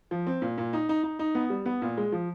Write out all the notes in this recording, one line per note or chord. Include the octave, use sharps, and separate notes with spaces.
F3
C4
A#2
A#2
D#4
D#4
D#4
D#4
B3
G3
B3
A#2
G#3
F3